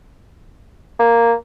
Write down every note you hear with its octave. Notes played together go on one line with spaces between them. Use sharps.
A#3